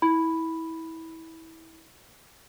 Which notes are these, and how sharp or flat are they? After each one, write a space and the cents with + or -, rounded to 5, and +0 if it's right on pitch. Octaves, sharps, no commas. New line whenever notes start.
E4 -25 B5 +0